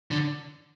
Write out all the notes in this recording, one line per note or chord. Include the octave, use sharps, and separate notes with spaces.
D3